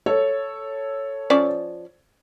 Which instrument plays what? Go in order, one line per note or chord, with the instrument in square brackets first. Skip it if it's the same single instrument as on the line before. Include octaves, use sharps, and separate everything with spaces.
[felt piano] A4 C#5
[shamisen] F3 C#4 D5